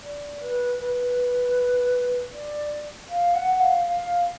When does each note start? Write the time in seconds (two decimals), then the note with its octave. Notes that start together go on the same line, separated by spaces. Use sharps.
0.01 D5
0.40 B4
0.78 B4
2.32 D5
3.09 F5
3.34 F#5
3.59 F5
3.86 F5